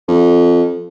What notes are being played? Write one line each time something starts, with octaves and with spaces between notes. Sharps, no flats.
F2